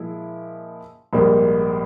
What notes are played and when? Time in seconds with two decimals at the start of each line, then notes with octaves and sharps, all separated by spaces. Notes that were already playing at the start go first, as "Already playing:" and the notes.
Already playing: A#2 F3 G#3 E4
1.13 A#1 G#2 G3 A#3